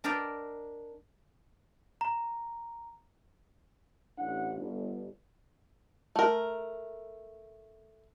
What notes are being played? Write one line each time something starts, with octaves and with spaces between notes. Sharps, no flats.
D4 A#4 D5 D#5 G5 A#5
A#5
A1 D4 E4 F#5
G1
A3 A#4